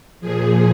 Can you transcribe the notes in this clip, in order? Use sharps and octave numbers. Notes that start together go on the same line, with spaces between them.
A#2 F3 G#4